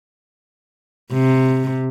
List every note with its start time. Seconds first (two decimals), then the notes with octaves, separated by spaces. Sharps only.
1.12 C3